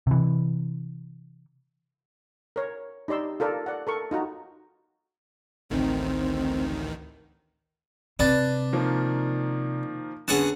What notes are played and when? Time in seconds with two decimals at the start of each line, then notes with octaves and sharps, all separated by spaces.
0.07 C3 E3
2.56 A#4 C#5
3.08 D#4 G4 D5 C6 E6
3.40 F4 A4 A#4 D5
3.66 D5 F#5
3.87 A4 A#4 C#6
4.11 D#4 F4 F#4 A#5
5.70 A1 D2 D#3 C4
8.19 C3 D4 B4 A6
8.73 D#3 F3 A#3
10.28 D3 B3 C#4 G#4 F#5 A5